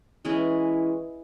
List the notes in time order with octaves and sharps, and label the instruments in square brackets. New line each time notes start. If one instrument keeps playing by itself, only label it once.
[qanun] E3 G#3 C#4 E4